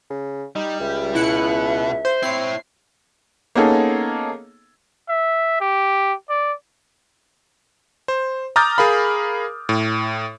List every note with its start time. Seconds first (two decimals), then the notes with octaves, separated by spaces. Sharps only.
0.10 C#3
0.56 G3 D#4
0.80 C#2 E5
1.15 B2 E4 F#6 C#7
2.05 C5
2.23 C4 E4 C#5 C7
3.55 A#3 B3 C#4 D#4 G#4 A4
5.09 E5
5.61 G4
6.30 D5
8.08 C5
8.56 A#5 D6 D#6 F6 G6 A6
8.78 G#4 A#4 F5 B5
9.69 A2